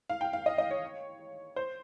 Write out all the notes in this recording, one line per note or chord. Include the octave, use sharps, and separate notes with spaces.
F5
G5
F5
D#5
D#5
C#5
C5